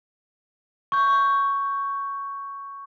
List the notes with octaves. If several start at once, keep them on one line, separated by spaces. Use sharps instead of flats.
C#6 G6